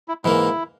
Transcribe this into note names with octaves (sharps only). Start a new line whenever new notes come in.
E4
G#2 E3 A#3 E4